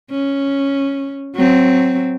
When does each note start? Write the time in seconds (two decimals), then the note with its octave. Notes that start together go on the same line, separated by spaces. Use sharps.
0.11 C#4
1.35 F#3 C4